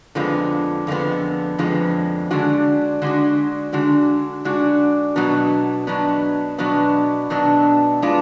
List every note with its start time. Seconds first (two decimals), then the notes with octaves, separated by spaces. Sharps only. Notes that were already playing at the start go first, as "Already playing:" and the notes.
0.15 F2 D3 F3 G#3 B3
0.87 F2 D3 F3 G#3 B3
1.58 F2 D3 F3 G#3 B3
2.31 D3 G#3 D4 F#4
3.02 D3 G#3 D4 F#4
3.73 D3 G#3 D4 F#4
4.45 D3 G#3 D4 F#4
5.16 B2 F#3 B3 D4
5.87 B2 F#3 B3 D4
6.58 B2 F#3 B3 D4
7.30 B2 F#3 B3 D4
8.02 G#3 B3 D4 F4